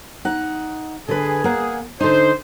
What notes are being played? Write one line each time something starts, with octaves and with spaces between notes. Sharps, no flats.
D#4 F#5
D3 G#4 B4
A#3 F#5
D3 D#4 C5